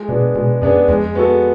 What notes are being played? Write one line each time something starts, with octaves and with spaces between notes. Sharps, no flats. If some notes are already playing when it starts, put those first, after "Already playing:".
Already playing: G#3
B2 B3 D4 G#4
B2 G#3
F#2 B3 D4 G#4
F2 G#3
B3 F#4 A4